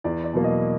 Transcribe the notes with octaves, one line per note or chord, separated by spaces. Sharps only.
E2 D5
D5
B2 F#3 A#3
D#5